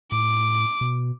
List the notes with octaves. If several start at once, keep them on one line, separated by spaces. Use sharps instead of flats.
A2 D6
B2